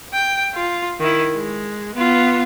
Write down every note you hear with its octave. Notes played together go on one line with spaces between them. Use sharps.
G5
F4
D#3 E4
G#3
B3 F4